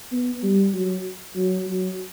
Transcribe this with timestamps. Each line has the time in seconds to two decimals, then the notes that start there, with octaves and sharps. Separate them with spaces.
0.12 B3
0.43 G3
0.74 F#3
1.35 F#3
1.67 F#3